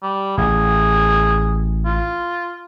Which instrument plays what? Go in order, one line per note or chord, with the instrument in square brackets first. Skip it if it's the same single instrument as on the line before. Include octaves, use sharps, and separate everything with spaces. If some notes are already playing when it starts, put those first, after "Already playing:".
[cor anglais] G3
[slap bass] A1 [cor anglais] G#4
[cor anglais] F4